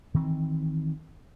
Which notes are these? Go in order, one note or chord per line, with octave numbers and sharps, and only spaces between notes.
D#3 E3 C4